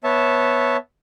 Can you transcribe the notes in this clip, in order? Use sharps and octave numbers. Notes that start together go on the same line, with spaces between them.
B3 C#5 E5 A5